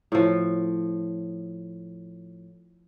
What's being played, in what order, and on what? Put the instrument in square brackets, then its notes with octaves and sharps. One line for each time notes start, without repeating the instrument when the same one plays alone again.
[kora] A2 F3